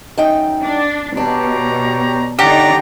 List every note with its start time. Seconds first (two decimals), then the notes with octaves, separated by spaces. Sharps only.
0.18 F#2 D#4 G5
0.63 D4
1.17 B2 D4 G4 C#5 A#5
2.39 D3 D4 D#4 G4 C#5 D5 F#5 A#5